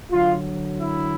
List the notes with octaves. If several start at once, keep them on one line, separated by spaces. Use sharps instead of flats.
D3 F#3 F4
E4